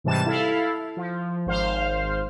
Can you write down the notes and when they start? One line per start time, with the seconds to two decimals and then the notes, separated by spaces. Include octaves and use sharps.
0.04 G#2 C3 E3 G3 A5 E7
0.26 E4 A4 F5
0.97 F3
1.46 G#1 C5 F5